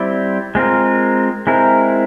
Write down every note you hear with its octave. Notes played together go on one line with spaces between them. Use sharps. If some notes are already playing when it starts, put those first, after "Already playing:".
Already playing: G3 C4 E4 G4
G#3 C4 F4 A#4
G#3 C4 E4 A#4